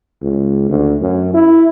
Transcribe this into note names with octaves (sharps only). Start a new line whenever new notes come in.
C#2
D2
F#2
E4